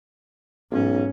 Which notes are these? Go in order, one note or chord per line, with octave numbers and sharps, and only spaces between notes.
B1 G#2 C#4